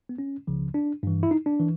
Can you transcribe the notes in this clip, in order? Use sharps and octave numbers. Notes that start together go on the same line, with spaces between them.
B3
C#4
C#2 C#3 F3
D4
G2 E3
E4
D#4
D4
E3